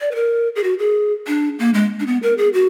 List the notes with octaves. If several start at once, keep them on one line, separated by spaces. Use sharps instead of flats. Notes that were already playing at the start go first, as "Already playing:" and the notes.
D5
B4
A#4
G#4
F#4
G#4
D4
A#3
G#3
D4
B3
A#4
G#4
F#4